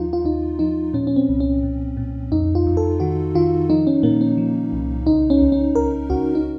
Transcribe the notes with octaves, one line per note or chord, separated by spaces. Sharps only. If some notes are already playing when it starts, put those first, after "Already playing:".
Already playing: D#2 F3 D#4 F4
F4
D#2 D#4
F3 D#4
A#2 C#4
C#4
C4
C2
C#4
A#2
A#2
F2 D#4
F4
F2
A4
D#3 F#4
D#3 F4
F3 D#4
C#4
A#2 A#3
C#4
F3
C2
C#2 D#4
C#4
C#2
C#4
C#2 A#4
C#2 F#4
D#4